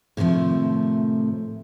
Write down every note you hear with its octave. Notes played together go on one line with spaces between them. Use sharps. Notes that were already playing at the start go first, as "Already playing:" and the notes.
A2 C3 D#3 F3 A3